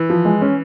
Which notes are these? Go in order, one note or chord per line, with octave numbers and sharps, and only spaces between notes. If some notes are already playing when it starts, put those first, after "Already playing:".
Already playing: E3
F3
G#3
C#4